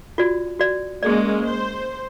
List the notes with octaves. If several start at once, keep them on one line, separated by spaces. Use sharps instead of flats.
F4 F#4 D5
F#4 D5
G#3 A#3 C#4 G#4 D5
C5